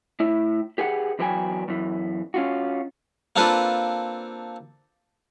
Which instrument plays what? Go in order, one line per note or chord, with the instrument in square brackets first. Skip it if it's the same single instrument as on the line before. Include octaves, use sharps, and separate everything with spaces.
[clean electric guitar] A2 E4
G4 G#4 B4 F#5
E2 F#3 B4 G5 G#5
F#2 E3
C#4 F4 F#4
[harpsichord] A#3 C4 D4 F4 A4 B4